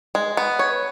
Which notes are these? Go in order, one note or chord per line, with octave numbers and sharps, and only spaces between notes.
G#3
B3
C#5